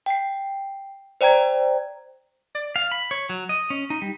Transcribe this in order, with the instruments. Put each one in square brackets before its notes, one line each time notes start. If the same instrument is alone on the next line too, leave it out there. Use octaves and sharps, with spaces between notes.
[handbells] G5 C7
C5 D5 G5 A#5 G#6
[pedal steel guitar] D5
F5
B5
C#5
F#3
D#5
C#4
D#4
G3